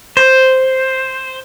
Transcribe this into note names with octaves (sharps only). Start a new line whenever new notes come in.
C5